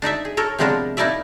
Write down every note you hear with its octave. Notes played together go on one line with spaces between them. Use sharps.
D4 D#4 D5 E5
G#4
A4 A#4 C#5
C3 F3 G#3 B3 D4 A#4
A#3 D#4 E4 A#4 D5 E5